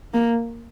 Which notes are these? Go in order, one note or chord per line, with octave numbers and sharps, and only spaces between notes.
A#3